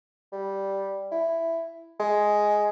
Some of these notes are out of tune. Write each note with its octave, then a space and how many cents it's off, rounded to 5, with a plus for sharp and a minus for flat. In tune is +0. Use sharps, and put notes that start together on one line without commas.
G3 -5
E4 +5
G#3 +5